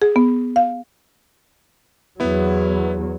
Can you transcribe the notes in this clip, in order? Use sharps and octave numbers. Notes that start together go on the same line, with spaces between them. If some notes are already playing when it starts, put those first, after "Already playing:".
G#4
B3
F5
E2 F#3 B3 E4